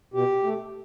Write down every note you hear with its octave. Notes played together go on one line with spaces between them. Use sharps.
B2 G4
A3